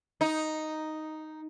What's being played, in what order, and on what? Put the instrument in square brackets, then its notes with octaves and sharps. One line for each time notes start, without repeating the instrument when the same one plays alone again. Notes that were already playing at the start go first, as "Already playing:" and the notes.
[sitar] D#4